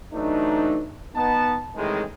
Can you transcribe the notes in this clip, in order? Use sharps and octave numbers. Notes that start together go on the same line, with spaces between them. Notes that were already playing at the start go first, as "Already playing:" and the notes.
E3 F#3 A3 D4 D#4
B3 D#4 A5
A2 C3 D#3 E3 G#3